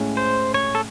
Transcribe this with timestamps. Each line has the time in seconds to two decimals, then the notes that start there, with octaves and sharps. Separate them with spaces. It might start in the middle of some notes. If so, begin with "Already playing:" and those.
Already playing: A2 G#3 C#4
0.17 C5
0.54 C#5
0.75 A4